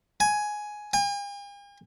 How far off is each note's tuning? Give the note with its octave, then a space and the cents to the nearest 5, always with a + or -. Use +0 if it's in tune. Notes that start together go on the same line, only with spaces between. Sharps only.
G#5 +10
G#5 -45